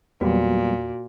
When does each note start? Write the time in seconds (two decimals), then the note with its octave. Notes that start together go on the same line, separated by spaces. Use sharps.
0.21 E2 A#2 F#3 G3 B3 F#4